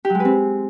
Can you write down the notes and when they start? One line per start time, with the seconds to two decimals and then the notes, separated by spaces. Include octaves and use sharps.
0.05 G4
0.10 F#3
0.15 G#3
0.20 B4
0.25 C4